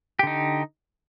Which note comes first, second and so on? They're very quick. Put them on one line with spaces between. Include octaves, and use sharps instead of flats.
G4 D3 D#4